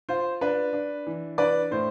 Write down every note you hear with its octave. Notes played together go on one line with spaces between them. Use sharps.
F4 C5
D4 B4
D4
E3
D4 B4 D5
A2 C5